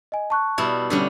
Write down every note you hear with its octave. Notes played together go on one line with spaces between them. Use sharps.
D#5 G#5
A5 C#6 F#6
B2 G3 E4
D3 G3 C#4